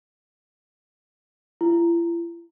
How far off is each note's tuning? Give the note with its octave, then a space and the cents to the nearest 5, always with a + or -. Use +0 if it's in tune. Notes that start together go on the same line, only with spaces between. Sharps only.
E4 +45